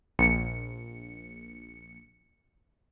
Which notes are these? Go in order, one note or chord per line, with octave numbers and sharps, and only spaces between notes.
A#1 C#7